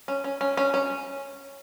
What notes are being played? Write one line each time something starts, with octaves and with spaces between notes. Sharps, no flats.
C#4
C#4
C#4
C#4
C#4